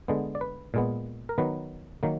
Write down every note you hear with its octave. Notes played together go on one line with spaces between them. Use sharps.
D3 G#3 B3
D5
B4
A#2 G#3 B3
A#4
D#3 F#3 B3 B4
D#3 F#3 A#3